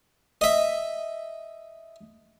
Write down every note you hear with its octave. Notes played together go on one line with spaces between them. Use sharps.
D#5 E5